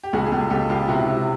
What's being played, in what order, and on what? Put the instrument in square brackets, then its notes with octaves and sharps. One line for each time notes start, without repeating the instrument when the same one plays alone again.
[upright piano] G4
[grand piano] C#2 [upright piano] F#4 G#4
[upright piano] G#4
[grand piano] C#2 [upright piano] G4 A4
[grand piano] C#2 [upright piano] G4 A4
[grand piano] C#2 [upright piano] F4 G4
[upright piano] G4
[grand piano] C3 [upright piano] E4 F#4
[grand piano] C3